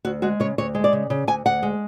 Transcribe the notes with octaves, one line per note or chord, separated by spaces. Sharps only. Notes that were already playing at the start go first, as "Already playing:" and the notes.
D2 F#4
G#3 F#4
C#3 C#5
D2 C#5
G#3
D5
C#3
C#3
D2 G#5
D2 F#5
G#3